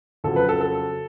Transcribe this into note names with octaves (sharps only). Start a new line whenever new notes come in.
F2 C#3 F#3 A4
B4
A4
A4